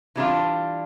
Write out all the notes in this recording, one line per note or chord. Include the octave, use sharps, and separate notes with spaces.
E3 G3 D4 F4